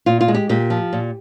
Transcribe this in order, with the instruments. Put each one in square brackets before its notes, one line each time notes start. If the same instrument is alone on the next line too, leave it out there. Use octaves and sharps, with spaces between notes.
[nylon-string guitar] A#2 F4
F4
G#3
G4
A#2 G4
F3
A#2